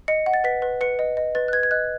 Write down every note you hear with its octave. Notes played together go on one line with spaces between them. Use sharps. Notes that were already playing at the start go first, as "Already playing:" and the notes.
D#5 C#7
F#5
A6
B4 B6
B4
B4 C#7
D#5
D#5
B4 A6
F#6
B4 G#6
G#6
D#5 F#6